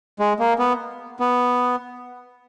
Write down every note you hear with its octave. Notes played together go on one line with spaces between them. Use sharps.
G#3
A#3
B3
B3